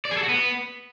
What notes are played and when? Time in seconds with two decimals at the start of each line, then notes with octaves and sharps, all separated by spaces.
0.05 D5
0.11 G#4
0.17 A4
0.23 F#4
0.29 B3